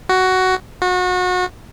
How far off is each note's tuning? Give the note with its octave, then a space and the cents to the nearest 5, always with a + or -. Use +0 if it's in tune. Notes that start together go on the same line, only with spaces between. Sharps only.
F#4 +10
F#4 -30